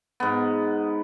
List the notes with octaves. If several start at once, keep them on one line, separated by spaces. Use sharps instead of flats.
G#2 B3